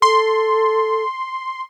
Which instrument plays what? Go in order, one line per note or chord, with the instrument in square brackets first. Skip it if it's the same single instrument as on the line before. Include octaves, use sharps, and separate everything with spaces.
[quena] A4 [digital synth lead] C6